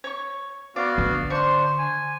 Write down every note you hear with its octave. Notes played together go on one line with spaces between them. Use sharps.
C#5 C#6
B3 F#4 D5 F5
D3
D4 C5 C6 C#6
G#5